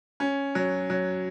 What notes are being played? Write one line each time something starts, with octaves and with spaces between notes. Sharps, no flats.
C#4
F#3
F#3